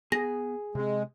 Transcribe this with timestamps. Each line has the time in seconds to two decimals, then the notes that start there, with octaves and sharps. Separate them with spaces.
0.12 B3 G#4 A#6
0.75 C3 G#3 C4